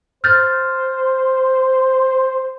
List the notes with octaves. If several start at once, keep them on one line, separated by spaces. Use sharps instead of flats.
C5 F6 G6 A6